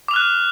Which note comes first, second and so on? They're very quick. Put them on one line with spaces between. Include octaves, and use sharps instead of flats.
D6 F7 F6 F#6